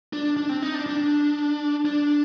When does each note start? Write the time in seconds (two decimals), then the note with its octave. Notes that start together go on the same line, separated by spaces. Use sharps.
0.13 D4
0.37 D4
0.49 C4
0.62 D#4
0.74 D4
0.86 D4
1.85 D4